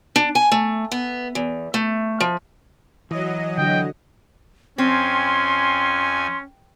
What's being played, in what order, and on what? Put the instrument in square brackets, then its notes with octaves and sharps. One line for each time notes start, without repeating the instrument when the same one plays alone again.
[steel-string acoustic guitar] D4
G#5
A3
B3
E2
A3
F3
[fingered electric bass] E3 [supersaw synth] F#3 D#5
[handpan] D3 F#4 [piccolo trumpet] G5
[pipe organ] F2 G#5 [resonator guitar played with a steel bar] C4 [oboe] C#4 [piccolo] C6